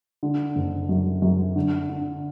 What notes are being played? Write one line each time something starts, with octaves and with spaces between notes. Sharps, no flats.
D3
F#1
F#2
F#2
D3
D3